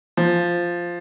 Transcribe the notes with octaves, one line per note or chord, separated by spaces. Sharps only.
F3